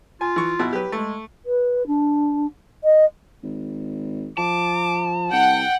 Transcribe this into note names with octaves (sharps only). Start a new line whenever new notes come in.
F4 G#5
E3 C#6
B2 E4 F#4
F#3 G4 B4
G#3 A3
B4
D4
D#5
G#1
F3 A5 D6
C2 F#5 G5